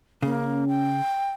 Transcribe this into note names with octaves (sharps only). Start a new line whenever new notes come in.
C#3 A#3 C#4
G5